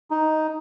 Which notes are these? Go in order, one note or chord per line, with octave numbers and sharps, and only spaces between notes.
D#4